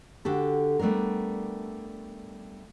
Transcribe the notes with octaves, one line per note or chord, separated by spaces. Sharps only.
D3 F#4 G4 A4
G3 A3 B3 D4 A#4